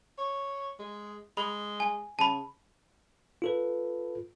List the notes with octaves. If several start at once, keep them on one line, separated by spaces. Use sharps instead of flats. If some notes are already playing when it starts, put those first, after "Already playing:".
C#5
G#3
G#3 B5
G#5
C#3 A5 B5
F4 A4 B4